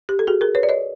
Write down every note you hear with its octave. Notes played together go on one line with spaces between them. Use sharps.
G4
A4
F#4 G#4
G#4 A#4
B4 C#5
D5
C#5 D#5